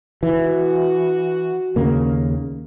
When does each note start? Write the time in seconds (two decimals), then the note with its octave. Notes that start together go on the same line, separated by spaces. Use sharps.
0.23 E3 F#4
1.76 D#2 C#3 A#3